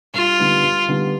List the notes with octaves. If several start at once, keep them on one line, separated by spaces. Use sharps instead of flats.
G2 F4
D3 G3 B3 D#4
G2
D3 G3 B3 D#4